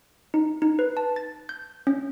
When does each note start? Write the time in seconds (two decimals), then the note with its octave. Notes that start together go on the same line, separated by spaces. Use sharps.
0.34 D#4
0.62 D#4
0.79 B4
0.97 A5
1.16 A6
1.49 G6
1.87 C#4